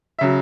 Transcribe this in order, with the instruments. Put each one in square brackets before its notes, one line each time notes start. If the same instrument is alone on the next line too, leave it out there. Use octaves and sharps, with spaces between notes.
[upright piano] C#3 F#3 E5